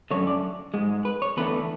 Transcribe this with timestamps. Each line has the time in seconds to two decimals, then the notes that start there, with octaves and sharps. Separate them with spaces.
0.11 F#2 D3 A3 C#5
0.27 D5
0.74 G#2 G#3
1.05 B4
1.22 C#5
1.37 E2 D3 A3 B4